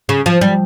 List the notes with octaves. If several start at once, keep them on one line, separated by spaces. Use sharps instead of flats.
C#3
F3
G3